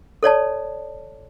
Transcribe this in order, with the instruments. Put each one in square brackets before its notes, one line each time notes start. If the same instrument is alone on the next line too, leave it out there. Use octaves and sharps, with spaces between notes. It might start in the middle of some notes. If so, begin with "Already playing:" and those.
[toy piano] A4 C#5 D5 A5